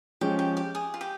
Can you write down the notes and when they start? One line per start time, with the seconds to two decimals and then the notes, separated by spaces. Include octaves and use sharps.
0.21 F3 G#3 C#4 G4
0.39 G4
0.57 G4
0.75 G#4
0.94 F4
1.01 G4